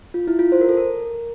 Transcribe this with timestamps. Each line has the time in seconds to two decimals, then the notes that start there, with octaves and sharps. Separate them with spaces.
0.14 F4
0.27 E4
0.39 F4
0.52 C5
0.61 A#4
0.68 A4
0.77 A#4